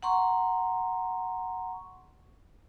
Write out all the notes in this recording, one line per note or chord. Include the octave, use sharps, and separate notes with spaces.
F#5 A#5 C6 C#6